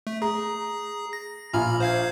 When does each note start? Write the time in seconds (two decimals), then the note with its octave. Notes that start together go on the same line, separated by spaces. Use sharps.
0.07 A3
0.22 G#4 A#5
1.13 A#6
1.53 A#1 F4 G#5 A#5 B5 F6
1.80 C5 F5 G#6